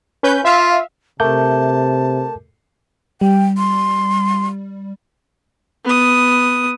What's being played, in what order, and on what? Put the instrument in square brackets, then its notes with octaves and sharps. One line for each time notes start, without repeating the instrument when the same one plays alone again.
[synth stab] C#4 B4 G6
[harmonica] F4 [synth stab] E5 F5
[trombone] C3 [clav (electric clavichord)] A3 [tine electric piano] A#4 D6 G6 [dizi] A5
[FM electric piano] G3 [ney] G5
[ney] C6
[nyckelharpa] B3 D#6